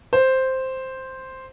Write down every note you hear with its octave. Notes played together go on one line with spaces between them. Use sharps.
C5